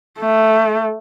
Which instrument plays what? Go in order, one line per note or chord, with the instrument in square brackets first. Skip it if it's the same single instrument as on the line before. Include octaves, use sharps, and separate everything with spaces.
[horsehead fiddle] A3